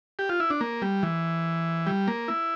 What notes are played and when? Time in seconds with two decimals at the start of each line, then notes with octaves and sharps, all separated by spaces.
0.19 G4
0.29 F4
0.40 E4
0.50 D4
0.61 A#3
0.82 G3
1.03 E3
1.87 G3
2.08 A#3
2.28 E4